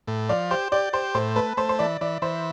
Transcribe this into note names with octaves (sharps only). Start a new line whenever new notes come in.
A2
F3 D5
G4 C5
G4 D5
G4 C5
A2 C5
A3 B4
A3 C5
C5
E3 D5
E3 D5
E3 C5